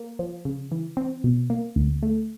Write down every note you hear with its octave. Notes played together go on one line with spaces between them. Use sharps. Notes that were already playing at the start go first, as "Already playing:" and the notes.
Already playing: A#3
F3
C#3
E3
C4
B2
A#3
D2
A3